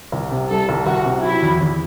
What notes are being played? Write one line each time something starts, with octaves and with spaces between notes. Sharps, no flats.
C2
C3
G3 A4
C2
C2 F#4
C3
F#3 E4
E2
E2